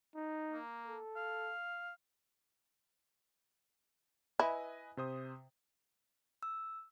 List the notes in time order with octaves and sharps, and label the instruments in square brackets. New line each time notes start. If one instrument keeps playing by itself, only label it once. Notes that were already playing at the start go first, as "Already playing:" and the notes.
[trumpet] D#4
[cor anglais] A#3
[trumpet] A4
[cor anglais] F5
[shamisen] E4 [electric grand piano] B4 D#5 G#5
[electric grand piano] C3 C5 D#6
[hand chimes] E6